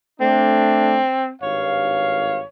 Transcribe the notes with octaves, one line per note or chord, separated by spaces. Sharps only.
A3 C4 D4
G#1 G2 C#5 F5